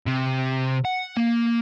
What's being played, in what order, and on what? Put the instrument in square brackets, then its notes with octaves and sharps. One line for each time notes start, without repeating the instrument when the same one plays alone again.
[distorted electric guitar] C3
F#5
A#3